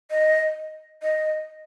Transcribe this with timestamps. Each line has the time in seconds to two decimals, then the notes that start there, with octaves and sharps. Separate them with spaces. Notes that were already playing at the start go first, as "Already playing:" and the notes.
0.11 D#5
1.02 D#5